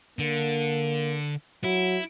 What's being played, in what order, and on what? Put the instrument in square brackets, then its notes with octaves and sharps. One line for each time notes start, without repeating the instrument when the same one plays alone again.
[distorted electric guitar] D3 [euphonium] A#3
[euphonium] F#3 [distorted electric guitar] E4